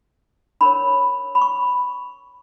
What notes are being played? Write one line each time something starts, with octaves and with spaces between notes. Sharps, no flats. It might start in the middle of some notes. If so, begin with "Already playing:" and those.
D4 A#4 C#5 B5
B5
C#6